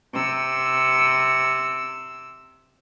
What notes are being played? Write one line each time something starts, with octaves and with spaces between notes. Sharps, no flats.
C3 E6